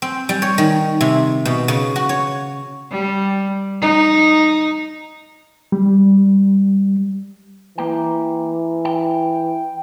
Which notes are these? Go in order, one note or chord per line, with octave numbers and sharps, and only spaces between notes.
C4
G3
C#5
D#3
C3
B2
C#3
F#4
C#5
G3
D#4
G3
E3 A#3 G5
G5